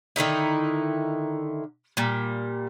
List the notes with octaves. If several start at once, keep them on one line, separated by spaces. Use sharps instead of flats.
D3 D#3 D#4 E4
A#2 G3